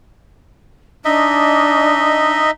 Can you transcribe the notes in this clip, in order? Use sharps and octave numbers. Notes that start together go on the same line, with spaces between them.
D4 D#4 D#5 E5